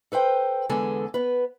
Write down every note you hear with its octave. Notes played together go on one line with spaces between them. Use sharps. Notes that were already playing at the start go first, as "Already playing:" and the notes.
A4 B4 C5 G5
E2 D3 G#3 A4 B4 G#5
B3 B4